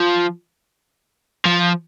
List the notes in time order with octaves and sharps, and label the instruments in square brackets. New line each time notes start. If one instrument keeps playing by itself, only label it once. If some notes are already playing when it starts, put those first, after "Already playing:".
Already playing: [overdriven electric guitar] F3
F3